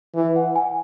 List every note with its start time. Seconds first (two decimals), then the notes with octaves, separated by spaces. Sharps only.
0.15 E3
0.36 F#5
0.56 G#5